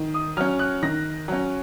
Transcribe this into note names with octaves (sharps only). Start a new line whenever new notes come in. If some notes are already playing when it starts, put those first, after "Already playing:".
Already playing: D#3
D#6
F#3 C#4 F6
F#6
D#3 A#6
F#3 C#4